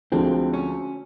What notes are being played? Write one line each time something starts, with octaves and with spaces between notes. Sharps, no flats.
D2 D3 F3 G#3 C4
C#4